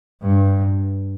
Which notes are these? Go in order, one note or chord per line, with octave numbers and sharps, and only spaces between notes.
G2